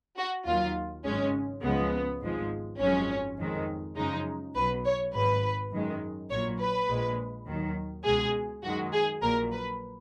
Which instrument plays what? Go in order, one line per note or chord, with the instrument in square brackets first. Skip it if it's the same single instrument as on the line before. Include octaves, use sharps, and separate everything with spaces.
[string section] F#4
D#2 D#3 F#3 F4
G#1 F#2 C#3 G#3 C#4
C#2 C#3 F3 G#3 B3
G#1 G#2 F3 G#3
G#1 F#2 F3 G#3 C#4
F2 D#3 G#3
F#2 C#3 F3 G#3 D#4
B1 B2 F#3 B4
C#5
G#1 G#2 F#3 B4
F#2 D#3 G#3
A#1 A#2 F#3 C#5
B4
A#1 A#2 G#3
D#2 D#3 F#3
C#2 B2 G#3 G#4
F#2 D#3 G#3 F#4
G#4
A#1 A#2 F#3 A#4
B4